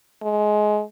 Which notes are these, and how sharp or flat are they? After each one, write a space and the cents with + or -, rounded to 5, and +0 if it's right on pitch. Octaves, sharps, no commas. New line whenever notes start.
G#3 +20